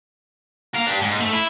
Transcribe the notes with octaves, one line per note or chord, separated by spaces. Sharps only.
A#4 F5
D4 G4
G#2
A3
E4